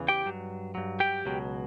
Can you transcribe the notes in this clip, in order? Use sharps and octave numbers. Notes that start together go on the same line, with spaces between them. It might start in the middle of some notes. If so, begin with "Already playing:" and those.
Already playing: E2 C#3 E3
G4 G5
G2 F#3
G2 F#3
G4 G5
C#2 B2 F#3